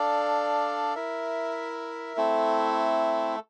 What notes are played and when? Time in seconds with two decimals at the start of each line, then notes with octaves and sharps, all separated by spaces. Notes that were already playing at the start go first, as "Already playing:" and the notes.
Already playing: D4 A4 D5 F5
0.95 E4 A#4 E5
2.17 A3 C4 E4 A4